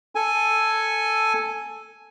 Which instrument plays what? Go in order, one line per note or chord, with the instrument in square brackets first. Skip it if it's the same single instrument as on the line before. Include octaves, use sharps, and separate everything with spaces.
[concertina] A4 G#5